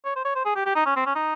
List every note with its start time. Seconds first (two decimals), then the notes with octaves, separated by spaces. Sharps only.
0.05 C#5
0.16 C5
0.25 C#5
0.35 C5
0.45 G#4
0.56 G4
0.66 G4
0.75 D#4
0.86 C#4
0.96 C4
1.06 C#4
1.15 D#4